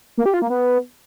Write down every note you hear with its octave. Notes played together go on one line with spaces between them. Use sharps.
A#3
G4
F4
A#3
B3